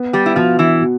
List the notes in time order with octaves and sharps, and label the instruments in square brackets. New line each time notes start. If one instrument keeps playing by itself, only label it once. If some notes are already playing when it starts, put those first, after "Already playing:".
Already playing: [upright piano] B3
[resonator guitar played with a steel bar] G3 G4
E4
[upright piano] B2 [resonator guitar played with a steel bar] F3 F4
[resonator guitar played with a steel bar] E3 E4
[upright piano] B2